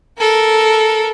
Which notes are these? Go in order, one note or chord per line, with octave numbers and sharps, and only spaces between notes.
A4 A#4